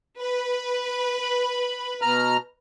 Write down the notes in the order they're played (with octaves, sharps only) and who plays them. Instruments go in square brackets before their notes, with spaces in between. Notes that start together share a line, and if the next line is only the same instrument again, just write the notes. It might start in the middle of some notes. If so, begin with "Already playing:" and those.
[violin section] B4
[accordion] B5
B2 A#5 F6